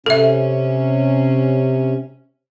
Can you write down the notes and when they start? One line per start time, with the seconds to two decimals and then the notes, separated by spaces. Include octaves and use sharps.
0.06 C3 C#4 A4 E5